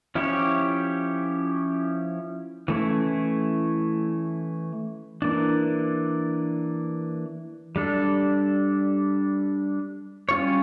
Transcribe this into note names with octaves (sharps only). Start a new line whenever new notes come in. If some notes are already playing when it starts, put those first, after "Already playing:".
F3 C#4 E4 G4 C#5
E3 A3 C#4 E4
E3 A#3 D4
G3 D4 A4
G3 C#4 F4 C#5